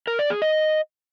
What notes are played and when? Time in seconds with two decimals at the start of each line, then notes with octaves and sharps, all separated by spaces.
0.07 A#4
0.19 D5
0.30 G#4
0.42 D#5